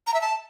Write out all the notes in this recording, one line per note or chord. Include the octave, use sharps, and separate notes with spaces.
A#5
E5
A5